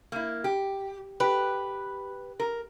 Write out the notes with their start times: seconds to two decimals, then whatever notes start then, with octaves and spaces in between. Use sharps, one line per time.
0.12 A#3 E4
0.44 G4
1.20 G4 B4
2.40 A#4